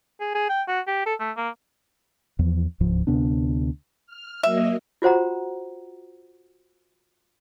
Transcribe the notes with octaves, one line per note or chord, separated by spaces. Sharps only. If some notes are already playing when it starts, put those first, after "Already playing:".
G#4
G#4
G5
F#4
G4
A4
A3
A#3
E2 F3
D1 C#2 G#2 F3
D2 C3 B3 D4
F6
F#3 A#3 D#5 E5
F4 F#4 C5 F#5 A#5